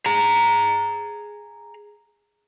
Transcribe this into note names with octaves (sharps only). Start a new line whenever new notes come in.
G#4 A#5